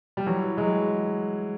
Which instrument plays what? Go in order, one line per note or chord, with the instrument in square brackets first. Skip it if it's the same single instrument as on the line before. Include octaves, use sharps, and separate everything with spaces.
[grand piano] G3
E3 F#3
F#3 G#3